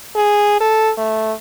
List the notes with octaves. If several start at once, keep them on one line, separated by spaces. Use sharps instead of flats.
G#4
A4
A3